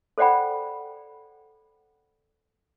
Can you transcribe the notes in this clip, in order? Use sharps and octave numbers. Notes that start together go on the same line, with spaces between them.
A4 C5 D5 F#5 G5 B5